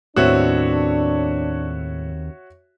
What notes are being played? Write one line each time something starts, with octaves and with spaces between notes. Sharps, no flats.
D#2 A2 B3 C4 D4 F#4 C#5 E5